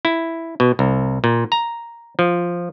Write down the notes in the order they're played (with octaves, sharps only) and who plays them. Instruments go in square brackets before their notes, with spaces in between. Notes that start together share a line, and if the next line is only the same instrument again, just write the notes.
[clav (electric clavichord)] E4
B2
C2
A#2
A#5
F3